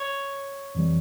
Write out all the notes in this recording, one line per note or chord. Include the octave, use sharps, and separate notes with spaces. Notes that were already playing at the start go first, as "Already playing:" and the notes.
Already playing: C#5
F2 E3 G3